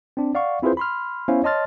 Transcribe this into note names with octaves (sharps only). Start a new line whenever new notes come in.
C4 D4
D5 F5 F#5 C#6
C4 E4 F4 G#4 B4 C5
B5 C6 F6
B3 C#4 E4 C5 F5
C#5 D#5 A5 C6 F6 A6